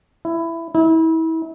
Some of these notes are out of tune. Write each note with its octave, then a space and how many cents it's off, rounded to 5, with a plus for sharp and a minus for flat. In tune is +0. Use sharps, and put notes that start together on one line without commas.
E4 +15
E4 -30